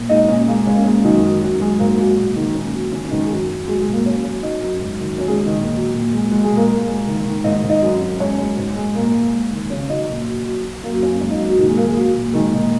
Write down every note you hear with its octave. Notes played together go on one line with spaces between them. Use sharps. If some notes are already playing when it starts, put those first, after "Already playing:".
Already playing: A#2
G#3 D#4 D#5
A#2 C#4
G#3 A#3
G#3 C#4
A#3
G#3 C#4
F#2 D#3 D#4
F#3
F#2 F#3 F#4
F#3 G#3 G#4
G#2 A#3 A#4
F#3 G#3 F#4
A#2 F#3 F#4
D#3 G#3 D#4
A#2 C#4
F#3
D#3 C#4
C#4
G#2 D#3 D#4
G#4
F#2 F#3 F#4
F#2
F#3 G#3 G#4
G#3 G#4
A#2
A#3 A#4
F#3 C#4 C#5
F#3
F#3 D#4 D#5
F#2
G#2
D#3
F#3 C#4 C#5
G#3 G#4
F#3
D#3 D#4
A#2
F#3
A#2
G#3
F#3 G#3 F#4
G#3 G#4
A#2
A#3 A#4
A#2
G#3
D#3
D#3
G#2 D#4 D#5
G#2
D#4 D#5
F#2
F#2
G#3 C#4 C#5
G#3
G#2
G#3
A#2 A#3 A#4
G#3
G#3
D#3
C#3 C#4 C#5
F#3 D#4 D#5
A#2
F#3
F#3
F#3
F#2 A#3 A#4
F#3 F#4
F#2 C#4
A#3
G#3 C#4
D#4 D#5
F#2
F#3 F#4
A#2 D#3 D#4
G#3 G#4
F#3 A#3 A#4
G#3 G#4
F#3 F#4
A#2
D#3 G#3 D#4
A#2 D#3 D#4